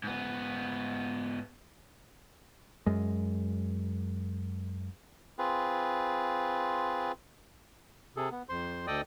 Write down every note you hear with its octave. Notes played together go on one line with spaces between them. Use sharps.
G#2 B3
F#2 G#3
C4 F4 G#4 B4
C3 G#4 A4
B3
F2 C5 C6
D2 A4 D5 D#5 G5 D#6